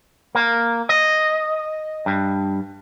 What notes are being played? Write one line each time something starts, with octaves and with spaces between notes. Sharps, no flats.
A#3
D#5
G2